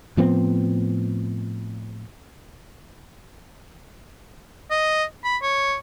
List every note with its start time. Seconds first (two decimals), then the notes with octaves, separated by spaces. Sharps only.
0.17 A2 F3 B3 C4
4.70 D#5
5.24 B5
5.42 C#5